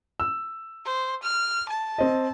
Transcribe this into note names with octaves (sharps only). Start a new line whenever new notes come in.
E6
C5
F6
A5
C4 D#5